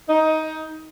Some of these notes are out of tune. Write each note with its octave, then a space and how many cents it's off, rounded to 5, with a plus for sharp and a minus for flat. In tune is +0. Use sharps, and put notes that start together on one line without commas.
D#4 +15